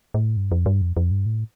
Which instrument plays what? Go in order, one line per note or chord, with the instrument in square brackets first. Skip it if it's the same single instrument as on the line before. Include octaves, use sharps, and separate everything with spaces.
[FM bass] A2
G2
F2
G2
F2
F2
G2
A2